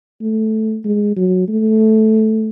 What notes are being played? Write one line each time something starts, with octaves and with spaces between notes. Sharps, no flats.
A3
G#3
F#3
A3